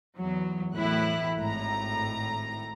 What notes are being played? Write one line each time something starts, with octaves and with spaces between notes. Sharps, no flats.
E2 F#3
B1 E2 A2 E4 F#6
G#1 A2 A#5